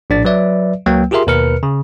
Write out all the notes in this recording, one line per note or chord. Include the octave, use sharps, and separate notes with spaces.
A#1 A2 D4 D5 A6
F#3 B4 D5 E5
C#2 F#3 A#3 G5
F4 G4 G#4 A#4 E5 C6
D#2 B2 A#4 B4 F6 C#7
C#3